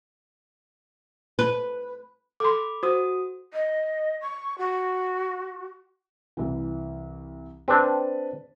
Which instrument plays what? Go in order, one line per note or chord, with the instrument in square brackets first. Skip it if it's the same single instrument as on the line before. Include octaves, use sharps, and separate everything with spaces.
[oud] B4
[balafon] A4 C6 [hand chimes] B5 D6
[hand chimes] F#4 D#6 [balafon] C5
[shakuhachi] D#5
C#6
F#4
[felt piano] C2 E3
[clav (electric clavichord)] C4 D4 [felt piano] B4 A5